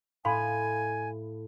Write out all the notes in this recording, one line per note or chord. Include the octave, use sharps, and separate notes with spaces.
A2 F5 G#5 B5 C6